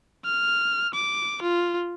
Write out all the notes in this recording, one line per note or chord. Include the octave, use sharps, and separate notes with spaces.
F6
D6
F4